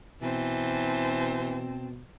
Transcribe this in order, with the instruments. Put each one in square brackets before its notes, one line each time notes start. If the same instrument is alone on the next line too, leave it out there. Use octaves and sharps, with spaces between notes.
[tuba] B2 [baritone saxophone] E3 [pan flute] C4 [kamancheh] C5 A5